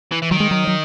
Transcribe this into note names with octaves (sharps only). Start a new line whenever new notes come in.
E3
E3
D#3 F#3
G#3
F#3
F#3